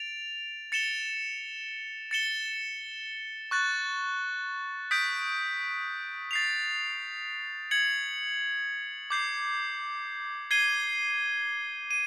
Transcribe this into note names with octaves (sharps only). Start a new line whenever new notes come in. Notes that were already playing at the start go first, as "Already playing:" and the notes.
Already playing: A6 D7 F7
A6 C#7 E7 G7
A6 C#7 E7 G7
C#6 F#6 A6
D#6 G6 B6 D7
A6 C7 F7
G#6 C#7 F#7
D6 G6 C7
G#6 C7 D#7 G7
D#7